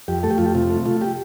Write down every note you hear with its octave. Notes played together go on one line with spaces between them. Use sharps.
F2 G4
A3 A4
G4
F2 F4
G4
C3 F4
A3
A3 F4
G4